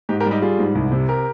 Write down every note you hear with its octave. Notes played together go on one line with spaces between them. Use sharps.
G#2 D#4 G4
G4 A#4
G3
D#4 G4
G3 F4 G#4
G#2
C2
C3
G4 A#4